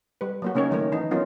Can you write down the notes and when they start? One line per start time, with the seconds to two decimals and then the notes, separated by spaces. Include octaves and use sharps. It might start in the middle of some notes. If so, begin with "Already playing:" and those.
0.21 G3 B4
0.42 F#3 A#3 F#4
0.55 C#3 A#3 C#4 D#4 C#5
0.71 D#3 F#3 A3 A#4
0.92 E3 D#4
1.11 F#3 B3 C#4 D#4 F4 A#4